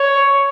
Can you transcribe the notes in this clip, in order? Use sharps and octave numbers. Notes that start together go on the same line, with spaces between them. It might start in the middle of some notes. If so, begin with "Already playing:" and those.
Already playing: C#5